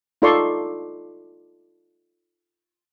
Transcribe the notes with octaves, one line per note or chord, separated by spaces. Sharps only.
D#4 F4 A4 D5 C6 C#6